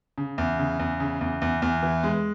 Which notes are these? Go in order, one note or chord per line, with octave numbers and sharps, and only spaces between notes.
C#3
E2
C#3
E2
C#3
E2
E2
E2
E3
G#3